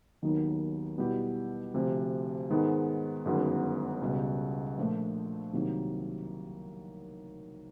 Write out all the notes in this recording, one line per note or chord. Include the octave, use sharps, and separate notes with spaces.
D#2 D#3 F#3 B3 D#4
B2 G3 B3 E4 G4
D2 C3 F3
G#2 D#3 G#3 B3
G1 F#2 D#3 G#3 B3
C#2 B2 G3
A#2 F3 A3 D4
C2 C3 D#3 F#3 A#3